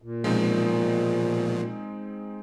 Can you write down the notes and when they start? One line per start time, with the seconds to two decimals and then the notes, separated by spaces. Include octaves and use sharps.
0.02 A#2
0.24 B2 F3 G#3 C4 D#4